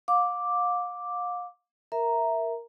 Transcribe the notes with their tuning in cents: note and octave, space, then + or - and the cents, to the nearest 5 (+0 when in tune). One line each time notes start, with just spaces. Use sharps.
F5 +35 D6 +0
A#4 +0 E5 +0 A#5 +0